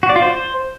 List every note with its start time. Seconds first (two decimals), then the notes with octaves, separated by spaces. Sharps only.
0.03 F#4
0.09 D5
0.16 F4
0.22 C5